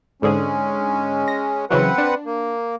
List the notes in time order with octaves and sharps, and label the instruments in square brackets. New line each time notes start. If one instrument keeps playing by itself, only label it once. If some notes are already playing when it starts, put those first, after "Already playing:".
[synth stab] G#2 D3 G#4 [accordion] G#3 C#4
[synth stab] A#6
[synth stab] C#3 E3 F#3 [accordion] C4 B4 F#5
[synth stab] D4
[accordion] A#3